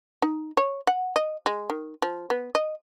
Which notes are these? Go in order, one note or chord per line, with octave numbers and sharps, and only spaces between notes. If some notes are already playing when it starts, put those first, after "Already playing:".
D#4
C#5
F#5
D#5
G#3
D#3
F3
B3
D#5